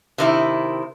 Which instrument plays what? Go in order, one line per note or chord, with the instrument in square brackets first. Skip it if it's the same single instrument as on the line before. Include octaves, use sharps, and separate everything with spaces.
[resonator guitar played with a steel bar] C3 D#3 E4